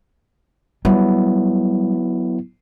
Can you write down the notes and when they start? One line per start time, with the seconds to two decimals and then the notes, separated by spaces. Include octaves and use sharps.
0.85 F#3 G3 B3 E4